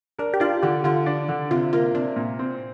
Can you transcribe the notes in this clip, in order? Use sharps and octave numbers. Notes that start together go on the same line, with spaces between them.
D4 A#4
G4
D4 F4
D3 G4
D3 F4
D4
D3
C3 F4
A#3 F4
C3 D4
A#2
C4